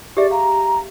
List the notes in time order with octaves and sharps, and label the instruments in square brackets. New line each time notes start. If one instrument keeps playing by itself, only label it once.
[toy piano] G4 G#4 E5 [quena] D5
[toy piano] F5 [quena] A#5